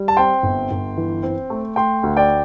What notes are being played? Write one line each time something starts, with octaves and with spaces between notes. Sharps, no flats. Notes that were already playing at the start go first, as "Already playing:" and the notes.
Already playing: G3
A5
C4 G5 C6
G1
G1
E3
C4
A3
A3 G5 C6
D2
D5 G5